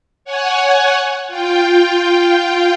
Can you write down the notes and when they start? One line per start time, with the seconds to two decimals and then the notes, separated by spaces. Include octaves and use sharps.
0.25 C#5 F#5 G#5
1.28 F4 G5